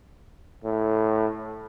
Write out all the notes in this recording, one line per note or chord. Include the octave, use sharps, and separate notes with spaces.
A2